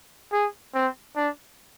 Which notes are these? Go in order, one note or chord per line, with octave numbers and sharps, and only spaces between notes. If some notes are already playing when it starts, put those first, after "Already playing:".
G#4
C4
D4